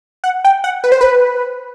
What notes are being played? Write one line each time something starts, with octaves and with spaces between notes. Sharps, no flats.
F#5
G5
F#5
B4
C5
B4